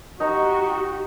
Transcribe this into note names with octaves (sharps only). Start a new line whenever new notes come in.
D#4 F#4 G4 A#5 C#6